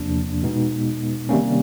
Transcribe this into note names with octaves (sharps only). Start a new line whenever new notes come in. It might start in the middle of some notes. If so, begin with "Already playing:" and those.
Already playing: E2 C3 F3 A#3 D4
B2 G#3 B3 D#4
C3 D#3 G3 A#3 C#4